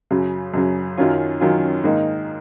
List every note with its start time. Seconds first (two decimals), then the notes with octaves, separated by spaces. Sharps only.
0.11 F#2 C#3 F#3
0.54 F#2 C#3 F#3
0.97 F#2 D#3 F#3 C#4 F4
1.40 F#2 D#3 F#3 C#4 F4
1.84 G#2 D#3 A#3 D#4